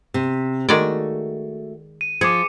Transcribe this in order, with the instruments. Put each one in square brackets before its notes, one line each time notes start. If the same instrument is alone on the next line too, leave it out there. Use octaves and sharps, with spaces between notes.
[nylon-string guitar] C3
[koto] D#3 G#3 D5 [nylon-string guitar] A3 F#4
[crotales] D#7
[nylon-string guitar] F3 [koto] G#4 [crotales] D6 C#7